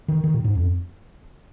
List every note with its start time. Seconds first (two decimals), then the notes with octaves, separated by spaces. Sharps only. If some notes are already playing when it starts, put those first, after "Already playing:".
0.08 D#3
0.24 D#3
0.34 A#2
0.44 G#2
0.55 F2